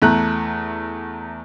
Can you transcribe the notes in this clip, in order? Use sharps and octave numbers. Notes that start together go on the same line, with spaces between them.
E2 A3 A#5 F#6